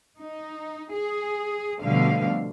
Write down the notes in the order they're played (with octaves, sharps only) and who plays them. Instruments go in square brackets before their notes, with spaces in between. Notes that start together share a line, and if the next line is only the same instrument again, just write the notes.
[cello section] D#4
G#4
B2 D3 F3 G3 A3 F5